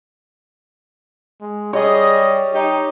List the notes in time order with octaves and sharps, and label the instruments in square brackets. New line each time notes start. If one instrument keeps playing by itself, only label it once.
[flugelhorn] G#3
[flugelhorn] G3 [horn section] G#4 D#5 [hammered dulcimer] C#5
[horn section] D#4 [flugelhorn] G4